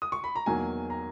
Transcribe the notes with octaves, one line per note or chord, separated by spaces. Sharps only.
D#6
C#6
B5
A#5
E2 D#3 F#3 A#3 G#5
A#5